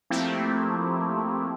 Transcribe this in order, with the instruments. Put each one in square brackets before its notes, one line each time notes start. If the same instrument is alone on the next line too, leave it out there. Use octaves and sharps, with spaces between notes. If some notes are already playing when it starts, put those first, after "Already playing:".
[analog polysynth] F3 A3 A#3 C4 E4 G4